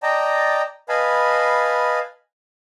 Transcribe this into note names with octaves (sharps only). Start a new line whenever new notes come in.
D5 D#5 G5 A5 A#5
B4 D#5 F5 G#5 A5 B5